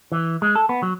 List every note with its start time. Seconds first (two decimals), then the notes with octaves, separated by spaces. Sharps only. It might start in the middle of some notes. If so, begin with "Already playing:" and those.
0.12 E3
0.42 G#3
0.55 A4
0.69 B3
0.83 F#3